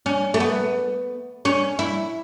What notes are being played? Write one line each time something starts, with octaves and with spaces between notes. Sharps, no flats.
C#4
A3
B3
C#4
E4